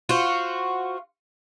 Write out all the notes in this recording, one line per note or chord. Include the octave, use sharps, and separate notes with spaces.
F4 F#4 C5